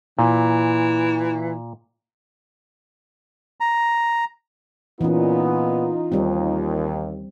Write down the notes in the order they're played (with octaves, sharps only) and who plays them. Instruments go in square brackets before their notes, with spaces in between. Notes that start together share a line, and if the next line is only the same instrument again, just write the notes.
[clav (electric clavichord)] A#2 [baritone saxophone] E3
[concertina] A#5
[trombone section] A#2 B3 [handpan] E3 C#4 [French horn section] D#4 F4
[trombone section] D#2 [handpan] G3 C4